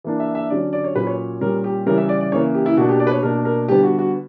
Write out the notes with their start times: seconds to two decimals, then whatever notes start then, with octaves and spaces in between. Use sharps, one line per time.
0.04 E3 A#3 D4
0.20 E5
0.35 E5
0.50 D3 F#3 C#4 D5
0.73 D5
0.84 C#5
0.95 A#2 F#3 C#4 B4
1.07 C#5
1.41 A#2 G3 C#4 A#4
1.64 G4
1.86 C#3 E3 G3 C#4 A#4
1.98 E5
2.09 D5
2.21 D5
2.32 C#3 E3 A#3 C#5
2.54 G4
2.66 E4
2.77 B2 A#3 D4 F#4
2.89 G4
3.00 D5
3.07 B4
3.11 C#5
3.23 B2 A#3 D4 A#4
3.45 A#4
3.68 D3 G3 B3 G4
3.83 F#4
3.99 F#4